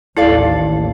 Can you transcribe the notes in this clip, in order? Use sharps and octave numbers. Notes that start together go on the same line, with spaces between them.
A1 D#2 E4 A4 D5 F5